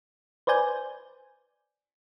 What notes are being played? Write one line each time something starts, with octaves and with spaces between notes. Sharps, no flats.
B4 C5 D5 G#5 G6